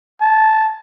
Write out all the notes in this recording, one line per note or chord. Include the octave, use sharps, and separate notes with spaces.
A5